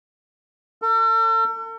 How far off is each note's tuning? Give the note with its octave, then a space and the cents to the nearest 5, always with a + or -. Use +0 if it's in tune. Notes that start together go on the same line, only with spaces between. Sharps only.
A4 +40